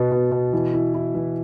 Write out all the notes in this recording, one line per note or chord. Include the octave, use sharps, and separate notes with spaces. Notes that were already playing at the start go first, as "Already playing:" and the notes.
Already playing: B2 B3
B2
B2
E3
E4
E4
E3